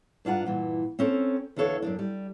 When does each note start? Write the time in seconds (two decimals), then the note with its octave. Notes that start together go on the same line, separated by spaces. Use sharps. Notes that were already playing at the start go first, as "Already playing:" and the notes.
0.25 G2 D4 F4 F#5 A#5
0.46 G2 A#2 E3
0.99 C4 C#4 A4 A#5
1.56 E2 D3 D4 A4 C#5 F5
1.82 F#2 B2 D4
1.99 G3